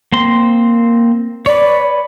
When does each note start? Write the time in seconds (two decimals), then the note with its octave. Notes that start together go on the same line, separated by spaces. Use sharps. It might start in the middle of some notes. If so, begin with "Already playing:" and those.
0.12 A#3 C4 C6
1.46 B4 C#5 D5